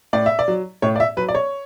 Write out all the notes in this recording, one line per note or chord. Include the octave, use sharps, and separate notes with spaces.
A2 D5
E5
D5
F#3
A2 C#5
D5
E5
F#3 B4
D5
C#5